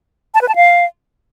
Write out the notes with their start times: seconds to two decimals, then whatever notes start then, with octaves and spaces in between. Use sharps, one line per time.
0.34 A5
0.41 B4
0.48 A5
0.55 F5